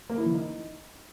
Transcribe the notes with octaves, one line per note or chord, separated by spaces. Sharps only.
A#3
E4
E3
D#4